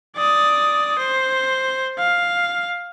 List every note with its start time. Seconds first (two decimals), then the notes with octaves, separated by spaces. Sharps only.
0.16 D5 D#6
0.99 C5
1.99 F5